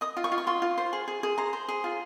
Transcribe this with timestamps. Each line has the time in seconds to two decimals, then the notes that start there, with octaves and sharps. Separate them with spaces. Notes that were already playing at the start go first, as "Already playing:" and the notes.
0.01 D#5 D#6
0.17 F4
0.24 C#6
0.32 F4
0.38 C#6
0.47 F4 C6
0.62 F4
0.78 C5
0.93 G#4
1.08 G#4
1.23 G#4
1.38 C5 A#5
1.53 C5
1.68 G#4
1.84 F4